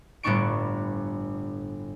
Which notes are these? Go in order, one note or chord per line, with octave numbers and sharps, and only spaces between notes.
G1 A2 B3 D4 C#6 D7